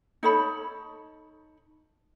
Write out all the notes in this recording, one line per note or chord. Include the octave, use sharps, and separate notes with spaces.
D#4 A4 C#5 B5